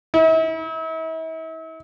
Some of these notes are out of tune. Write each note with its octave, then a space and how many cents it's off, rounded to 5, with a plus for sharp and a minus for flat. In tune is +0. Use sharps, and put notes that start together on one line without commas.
E4 -40